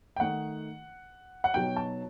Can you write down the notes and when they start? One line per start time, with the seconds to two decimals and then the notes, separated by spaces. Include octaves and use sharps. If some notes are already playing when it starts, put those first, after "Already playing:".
0.16 G5
0.20 D#3 A3 D#4 F#5
1.44 F#5
1.54 B2 F#3 B3 D#4 G5
1.76 A5